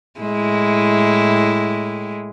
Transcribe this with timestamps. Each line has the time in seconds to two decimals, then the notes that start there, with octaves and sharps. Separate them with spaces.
0.20 A2 G#3 E4